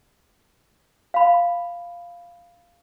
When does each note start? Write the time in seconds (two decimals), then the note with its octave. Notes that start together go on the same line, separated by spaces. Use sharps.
1.14 F5 B5